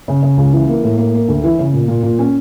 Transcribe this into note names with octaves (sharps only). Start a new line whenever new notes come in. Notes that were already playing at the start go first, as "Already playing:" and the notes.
C#3
C#3
C#2
E3
A#3
A2
A#3
A#3
D2
E3
C#3
A#2
A#2
A#2
C#4